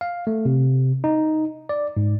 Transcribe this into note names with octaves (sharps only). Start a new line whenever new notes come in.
F5
A3
C3
D#4
D5
G#2